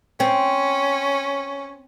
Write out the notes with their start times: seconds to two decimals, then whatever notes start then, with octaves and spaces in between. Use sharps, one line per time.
0.20 C4 C#4